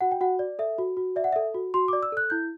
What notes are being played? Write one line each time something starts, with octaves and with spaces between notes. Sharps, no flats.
F#4 F#5
G5
F#4 F#5
D5
A4 E5
F#4
F#4
D5 E5
F#5
A4 E5
F#4
F#4 C6
D6
D5
E6
A4 F#6
E4 G6